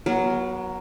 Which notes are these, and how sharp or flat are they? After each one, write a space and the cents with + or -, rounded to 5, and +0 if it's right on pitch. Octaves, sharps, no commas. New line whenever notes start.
F#3 +10 B3 -35 A#4 +0